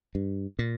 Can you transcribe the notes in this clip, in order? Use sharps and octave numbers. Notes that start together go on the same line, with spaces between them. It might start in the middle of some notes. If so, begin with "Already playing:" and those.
G2
A#2